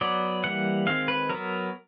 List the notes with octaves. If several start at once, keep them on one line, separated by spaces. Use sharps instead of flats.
F#3 B3 D5
E3 G3 A#3 F#5
D#3 G#3 C4 F5
B4
F#3 B3 A#4